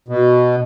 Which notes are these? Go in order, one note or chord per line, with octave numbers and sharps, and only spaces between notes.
B2